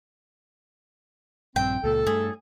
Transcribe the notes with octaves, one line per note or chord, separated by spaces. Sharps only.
A#1 G2 C4 G5
C#2 A#2 A4
G2 A3 G#4